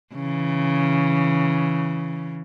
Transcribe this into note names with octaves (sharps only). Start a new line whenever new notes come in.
C#3 E3